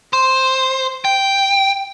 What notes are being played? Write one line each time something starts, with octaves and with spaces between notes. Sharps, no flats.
C5
G5